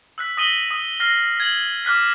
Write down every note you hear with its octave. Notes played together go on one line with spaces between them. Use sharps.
E6 F#6 B6
D#6 A#6 B6 D#7 F#7 G7
D#6
F6 A#6 C7 G7
G#6 F#7
D6 F6 F#6 B6